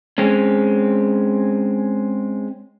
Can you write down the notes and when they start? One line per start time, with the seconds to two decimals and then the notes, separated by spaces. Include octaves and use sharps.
0.18 G#3 C4 C#4